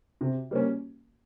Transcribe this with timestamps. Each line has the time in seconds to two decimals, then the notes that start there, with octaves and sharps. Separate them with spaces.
0.21 C3
0.51 G3 A#3 C#4